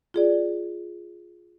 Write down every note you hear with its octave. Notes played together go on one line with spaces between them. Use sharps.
F4 G#4 D5